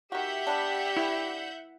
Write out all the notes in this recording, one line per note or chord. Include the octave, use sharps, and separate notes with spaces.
D#3 F#4 G4 E5 F#5 G6
G3 B3 D4
E4